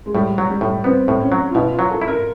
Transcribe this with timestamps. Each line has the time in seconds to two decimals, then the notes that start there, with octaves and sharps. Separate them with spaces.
0.06 G#3
0.14 A2 G3
0.38 F#3
0.50 G3
0.61 A2
0.84 B3 C4
1.08 A2
1.20 C#4
1.32 F#3
1.51 F4
1.55 B2 E4
1.73 F4
1.79 F#3
1.90 A4
2.02 E4
2.08 A#4